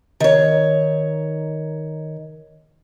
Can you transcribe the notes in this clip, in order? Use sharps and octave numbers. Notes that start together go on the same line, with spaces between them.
D#3 C#5